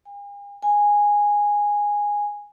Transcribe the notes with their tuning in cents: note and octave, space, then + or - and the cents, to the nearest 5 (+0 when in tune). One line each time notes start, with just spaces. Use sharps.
G#5 -45
G#5 -10